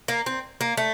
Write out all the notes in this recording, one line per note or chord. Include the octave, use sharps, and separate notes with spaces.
A#3
C4
A#3
A3